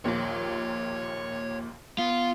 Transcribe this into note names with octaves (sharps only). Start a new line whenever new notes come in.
A#1 D#2 A#2 C#5 A#5
B3 F4